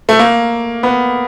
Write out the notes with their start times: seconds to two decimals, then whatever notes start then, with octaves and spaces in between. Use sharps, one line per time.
0.09 A3
0.19 A#3
0.83 B3